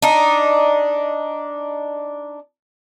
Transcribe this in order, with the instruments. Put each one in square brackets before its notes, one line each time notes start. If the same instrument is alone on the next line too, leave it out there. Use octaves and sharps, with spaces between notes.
[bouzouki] D4 D#4